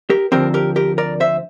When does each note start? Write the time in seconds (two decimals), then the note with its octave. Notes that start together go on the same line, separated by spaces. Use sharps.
0.10 G4 A#4
0.32 D2 D3 F3 C4 G4 A#4
0.54 G4 A#4
0.76 G4 A#4
0.98 A#4 D5
1.20 C5 E5